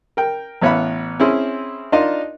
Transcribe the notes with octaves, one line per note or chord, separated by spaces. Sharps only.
A#4 G5
A1 B3 C#5 E5 F5 B5
C4 C#4 E4 G#4
D4 D#4 F4 A#4 D#5 F5